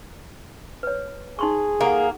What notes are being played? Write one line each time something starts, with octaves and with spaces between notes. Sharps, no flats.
B4 C#5
D#4 G#4 C6 C#6
A#3 G4 A4 F#5